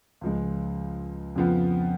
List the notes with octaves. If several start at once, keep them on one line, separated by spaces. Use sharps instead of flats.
C#2 C#3 F3 G#3
F2 C#3 F3 B3 F4